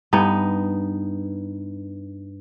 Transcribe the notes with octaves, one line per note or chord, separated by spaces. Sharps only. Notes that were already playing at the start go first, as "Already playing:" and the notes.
G2 B3 D#4